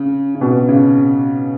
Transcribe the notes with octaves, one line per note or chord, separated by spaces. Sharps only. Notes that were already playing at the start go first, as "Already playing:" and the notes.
Already playing: C#3
C#3
B2
C#3